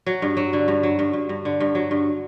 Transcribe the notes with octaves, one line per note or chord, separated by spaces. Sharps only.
F#3
G2
F#3
D3
G2
F#3
G2
G2
G2
D3
G2
F#3
G2